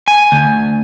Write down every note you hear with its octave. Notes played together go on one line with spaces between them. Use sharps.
G#5
D2